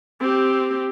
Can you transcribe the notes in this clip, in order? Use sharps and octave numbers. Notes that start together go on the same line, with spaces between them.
C4 G4